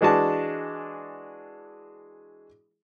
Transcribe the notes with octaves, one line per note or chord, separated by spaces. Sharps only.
E3 G#3 D4 F#4 A5